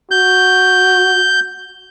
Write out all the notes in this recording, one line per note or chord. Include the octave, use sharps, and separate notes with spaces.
F#4 G6